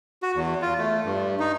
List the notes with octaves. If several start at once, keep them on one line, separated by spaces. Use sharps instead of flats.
F#4
E2
F4
A3
G2
D#4